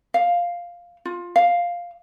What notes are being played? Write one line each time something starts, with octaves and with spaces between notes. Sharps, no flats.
F5
F4
F5